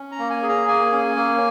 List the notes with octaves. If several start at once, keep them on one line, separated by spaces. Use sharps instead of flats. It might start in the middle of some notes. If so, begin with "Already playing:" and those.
Already playing: C#4
A#5
A#3
G#5
G#4
A#5
A#3 G#5
C#4
A#3